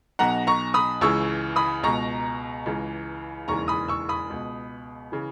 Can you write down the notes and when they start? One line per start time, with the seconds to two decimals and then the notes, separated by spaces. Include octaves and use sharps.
0.19 B1 B2 F#5 A#5
0.47 A#5 C#6
0.74 B5 D#6
1.01 C#2 C#3 E3 C#6 E6
1.56 B5 D#6
1.84 C#2 B2 A#5 C#6
2.66 C#2 C#3 E3
3.48 E1 D#2 C#3 E3 A#5 C#6
3.68 B5 D#6
3.88 C#6 E6
4.09 B5 D#6
4.30 C#2 B2
5.12 C#3 E3